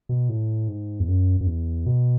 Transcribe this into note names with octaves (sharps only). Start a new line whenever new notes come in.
B2
A2
G#2
E2
F#2
F#2
E2
B2